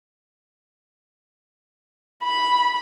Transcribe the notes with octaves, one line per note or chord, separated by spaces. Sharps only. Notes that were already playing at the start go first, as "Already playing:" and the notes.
B5